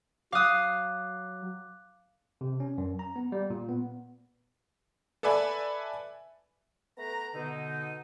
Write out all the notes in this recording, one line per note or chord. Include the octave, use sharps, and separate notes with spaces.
F#3 F5 D6 D#6 F#6
C3
C#4
F#2
A#5
B3
G3
A#2
B3
A4 B4 D5 E5 G#5 B5
A3 B3 B4 A#5
B2 D3 D#4